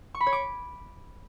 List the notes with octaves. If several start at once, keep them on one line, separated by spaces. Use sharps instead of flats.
C#6
B5
C#5
D6